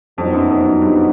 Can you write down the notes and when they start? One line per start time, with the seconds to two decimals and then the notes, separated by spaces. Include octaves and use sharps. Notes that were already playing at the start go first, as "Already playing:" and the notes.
0.18 F2 A#2 F#3 B3 D#4
0.34 F#2
0.50 F2
0.66 F#2
0.82 G2